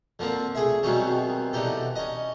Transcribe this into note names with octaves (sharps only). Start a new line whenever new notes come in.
D3 F3 A#3 C4
A3 G#4 E5
B2 D#3 F#3 G3 C4 C#4
D3 E3 D#4 G4 A4
C#4 D#5